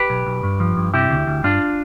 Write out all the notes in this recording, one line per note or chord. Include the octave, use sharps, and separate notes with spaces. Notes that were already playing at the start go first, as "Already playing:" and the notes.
Already playing: G4 B4
B1
B1
G2
F3
G2
C3 E4 G4
D2
D2
G2 D4 F4